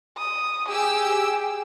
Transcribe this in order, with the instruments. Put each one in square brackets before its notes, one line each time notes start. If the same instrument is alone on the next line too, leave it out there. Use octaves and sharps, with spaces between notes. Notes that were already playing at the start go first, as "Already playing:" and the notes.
[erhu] D#6
[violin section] G4 E6 [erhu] G#4